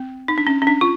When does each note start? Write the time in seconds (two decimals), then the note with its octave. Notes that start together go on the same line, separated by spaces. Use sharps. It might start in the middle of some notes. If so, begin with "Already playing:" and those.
Already playing: C4
0.28 D#4
0.38 D4
0.47 C#4
0.62 C#4
0.67 D4
0.81 F4